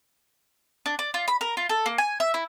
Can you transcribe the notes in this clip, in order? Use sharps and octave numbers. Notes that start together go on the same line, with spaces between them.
D4
D5
F4
B5
A#4
F4
A4
A#3
G#5
E5
E4